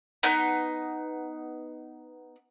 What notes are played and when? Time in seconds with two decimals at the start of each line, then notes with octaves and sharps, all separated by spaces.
0.23 B3 D#4 G6